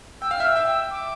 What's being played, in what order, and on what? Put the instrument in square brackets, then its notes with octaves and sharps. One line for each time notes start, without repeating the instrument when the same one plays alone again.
[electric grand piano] G5 [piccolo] E6
[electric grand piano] F5 [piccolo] F6
[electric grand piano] E5 G5 [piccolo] E6
[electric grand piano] E5 G5
[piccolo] D6